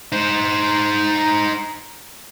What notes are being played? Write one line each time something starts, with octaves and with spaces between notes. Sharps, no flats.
D#4 C5